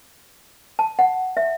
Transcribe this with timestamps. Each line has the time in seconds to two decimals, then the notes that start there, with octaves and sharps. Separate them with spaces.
0.79 A5
0.99 F#5
1.37 E5